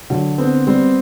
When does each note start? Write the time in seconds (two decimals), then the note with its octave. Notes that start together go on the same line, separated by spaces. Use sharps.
0.10 D3 F#3
0.38 B3 C4
0.67 G3 C4